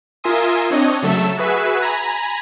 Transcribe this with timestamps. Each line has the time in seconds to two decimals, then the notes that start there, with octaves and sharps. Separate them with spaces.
0.24 F4 A#4 E5 G#5 C6 D#6
0.70 C4 D4 C#5 D#5
1.02 C#3 F#3 A3 A4 E5 E7
1.37 F#4 G#4 B4 E5
1.80 G#5 A#5 B5